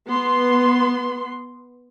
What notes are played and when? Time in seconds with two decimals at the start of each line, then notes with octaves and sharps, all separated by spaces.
0.10 B3 C6